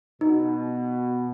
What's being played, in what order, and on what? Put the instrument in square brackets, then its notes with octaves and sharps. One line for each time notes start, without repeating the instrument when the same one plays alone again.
[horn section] B2 [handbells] D#4